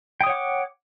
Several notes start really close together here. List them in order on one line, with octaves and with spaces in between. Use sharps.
G5 D#6 C#5 F#5 D6